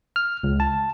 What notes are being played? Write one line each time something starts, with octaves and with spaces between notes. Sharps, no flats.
F6
C#2
A5